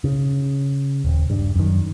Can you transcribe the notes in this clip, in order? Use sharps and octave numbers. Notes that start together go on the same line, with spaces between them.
C#3
D#1
G2
F#2 D#3